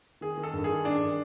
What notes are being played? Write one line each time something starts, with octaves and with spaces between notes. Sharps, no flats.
D#3 G#4
D#3
A4
G2
G#4
D#3
D#3 D4